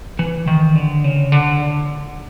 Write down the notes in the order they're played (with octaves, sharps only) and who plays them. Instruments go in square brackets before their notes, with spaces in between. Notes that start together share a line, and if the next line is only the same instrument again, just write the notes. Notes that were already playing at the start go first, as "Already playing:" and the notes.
[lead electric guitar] E3
D#3
D3
C#3
D3